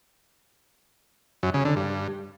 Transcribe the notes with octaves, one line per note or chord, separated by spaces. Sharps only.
F#2
C#3
D3
G2